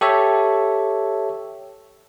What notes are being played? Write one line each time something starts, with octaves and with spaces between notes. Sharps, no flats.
G4 A4 C#5 E5